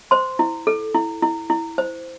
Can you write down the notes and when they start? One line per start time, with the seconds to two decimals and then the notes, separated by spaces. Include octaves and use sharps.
0.11 C5 C6
0.39 E4
0.67 A4
0.94 E4
1.22 E4
1.50 E4
1.78 C5